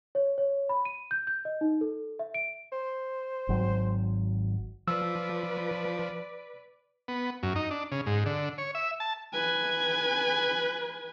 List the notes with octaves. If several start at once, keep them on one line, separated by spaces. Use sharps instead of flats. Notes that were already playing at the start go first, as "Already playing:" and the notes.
C#5
C#5
B5
D#7
G6
G6
D#5
D#4
A4
E5
D7
C5
G#1 F#3
F3 B4 D5 E6
B3
F#2
D#4
D4
C#3
G#2
D3
C#5
E5
A5
B4 G#5